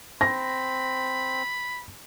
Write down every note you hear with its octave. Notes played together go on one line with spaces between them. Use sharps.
C4 B5 A#6